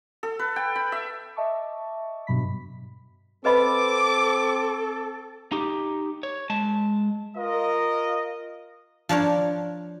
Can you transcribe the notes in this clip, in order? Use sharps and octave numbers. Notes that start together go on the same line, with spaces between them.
A4
B4
G5
B5
E5
D#5 E5 A5 C#6 D6
G2 B2 F#3 B5 B6
C4 A4 B4 D#5 B5 D6
D#4 G4
C#5
G#3 A5
F4 A#4 D#5
F3 D4 A#4 C#5